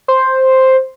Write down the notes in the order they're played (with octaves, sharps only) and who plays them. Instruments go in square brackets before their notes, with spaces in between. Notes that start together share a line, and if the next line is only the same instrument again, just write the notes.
[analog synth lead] C5